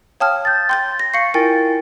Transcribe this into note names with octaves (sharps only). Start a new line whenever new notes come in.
C#5 F5 G5 A5 D#6 F6
G6 A6
G5 C6 G6 A6
A#6
F5 C#6 C7 C#7
E4 F4 A#4 G5 G#5 A6